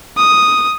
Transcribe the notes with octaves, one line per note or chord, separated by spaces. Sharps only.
D#6